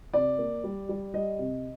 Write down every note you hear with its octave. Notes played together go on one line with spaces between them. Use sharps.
C3 D5
A#3
G3
G3
G3 D#5
C3